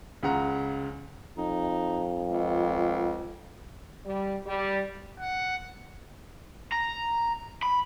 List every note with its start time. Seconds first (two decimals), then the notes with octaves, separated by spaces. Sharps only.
0.23 C#2 C#3 F#5 A#5
1.38 F2 D#4
2.30 C#2
4.04 G3
4.46 G3
5.20 F#5
6.72 A#5
7.63 B5